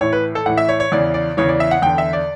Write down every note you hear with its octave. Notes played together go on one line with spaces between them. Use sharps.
A2 E3 C#5
B4
A4
A2 E3 F#5
E5
C#5
C#5
E2 C#3 E3 D5
D5
E2 C#3 E3 C#5
D5
E5
F#5
E2 D3 G5
E5
D5